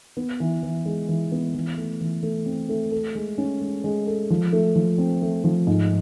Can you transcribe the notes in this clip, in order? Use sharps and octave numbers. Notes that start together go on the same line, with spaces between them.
B3
E3
E3
G#3
E3
B3
E3
A3
E3
A3
C4
A3
A4
G#3
C#4
G#3
G#3
A4
F3
A3
F3
C4
A3
F3
G#2